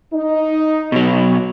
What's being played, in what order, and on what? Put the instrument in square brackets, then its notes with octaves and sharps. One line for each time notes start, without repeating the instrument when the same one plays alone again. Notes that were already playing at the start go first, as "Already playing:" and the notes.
[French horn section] D#4
[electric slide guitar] B2 F#3